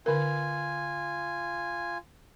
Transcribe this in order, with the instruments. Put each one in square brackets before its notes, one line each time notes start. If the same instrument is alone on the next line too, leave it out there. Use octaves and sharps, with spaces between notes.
[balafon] D3 A#4 [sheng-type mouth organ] F4 G#5